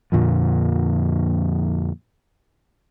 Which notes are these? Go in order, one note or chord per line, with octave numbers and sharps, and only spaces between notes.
F2 A#2 D3 F3